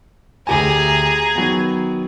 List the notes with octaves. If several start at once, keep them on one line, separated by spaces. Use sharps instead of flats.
D2 G4 G#4 G#5 A#5
D#3 F#3 B3